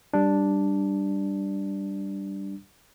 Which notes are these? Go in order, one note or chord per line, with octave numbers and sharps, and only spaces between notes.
G3 D4